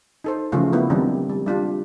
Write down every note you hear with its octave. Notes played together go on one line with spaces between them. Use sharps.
D#4 A4 C5
C#3 E3 F3 A3 F4 F#4
A#3 B3 E4
D#3 F#3 G3 A#3 C4 D4
G3
G3 D4 F4